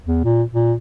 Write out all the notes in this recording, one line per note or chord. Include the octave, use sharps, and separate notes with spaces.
E2
A#2
A#2